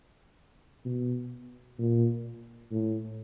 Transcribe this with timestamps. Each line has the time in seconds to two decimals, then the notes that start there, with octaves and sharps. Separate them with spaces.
0.85 B2
1.79 A#2
2.71 A2